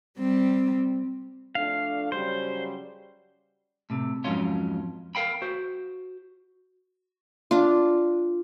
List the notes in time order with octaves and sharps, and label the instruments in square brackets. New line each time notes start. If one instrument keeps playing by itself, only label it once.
[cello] G3 C4
[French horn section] F2 A3 D4 [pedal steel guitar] F5
[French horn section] C#3 F#3 G3 [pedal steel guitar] C5
[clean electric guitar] A2 C3
F2 G#2 F#3 C#4 F4
A#4 F5 G5 B5
F#4 C5
[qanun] D4 F4